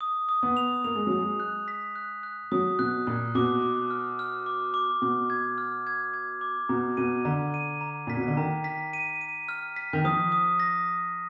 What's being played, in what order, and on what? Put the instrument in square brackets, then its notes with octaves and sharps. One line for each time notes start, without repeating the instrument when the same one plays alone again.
[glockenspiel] D#6
D#6
[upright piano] B3
[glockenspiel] F7
[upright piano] A#3 [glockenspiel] F7
[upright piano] G#3
[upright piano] F#3 [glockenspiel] D#6
[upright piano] G#3
[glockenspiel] F#6
B6
F#6
F#6
[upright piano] F#3 [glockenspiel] D#6
[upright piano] B2 [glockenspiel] F#6
[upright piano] A#2 [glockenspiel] F#6
[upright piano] B2 [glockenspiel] D6
[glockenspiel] D6
F6
F6
D6
D6
[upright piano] B2 [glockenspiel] D6
[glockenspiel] G#6
F6
G#6
G#6
D6
[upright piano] B2 [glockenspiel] A#5
[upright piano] B2 [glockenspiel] D#7
[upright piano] D3 [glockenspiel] A#5
[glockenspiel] D#7
A#5
[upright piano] A#2 [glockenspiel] B6
[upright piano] B2
D3
[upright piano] D#3 [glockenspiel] A#5
[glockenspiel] B6
D#7
D#7
F6
B6
[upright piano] D#3
[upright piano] F3 [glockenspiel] D#6
[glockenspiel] D#6
A#6
D#6